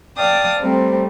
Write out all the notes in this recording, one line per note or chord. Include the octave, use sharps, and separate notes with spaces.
D5 F5 G5 A5 D#6
C3 G3 A3 C4